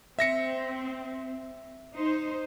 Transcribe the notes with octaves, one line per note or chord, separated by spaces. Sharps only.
C4 E5 A#6 C#7
D#4 C5